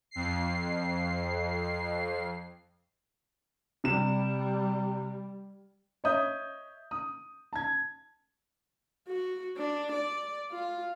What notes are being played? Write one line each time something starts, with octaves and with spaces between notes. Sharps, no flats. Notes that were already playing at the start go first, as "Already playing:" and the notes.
F2 C7
C3 G3 E7
C#5 D#5 E5 D#6 G6
D#6
A5 G#6
F#4
D4
D5
F4